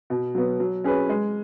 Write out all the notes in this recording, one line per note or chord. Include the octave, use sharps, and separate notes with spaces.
B2
F#3 B3
F#3
C#4 G#4 B4
G#3